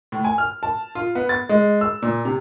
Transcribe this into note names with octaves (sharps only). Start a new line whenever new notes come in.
A2
G#5
F6
A5
F4
B3
A6
G#3
E6
A#2
C3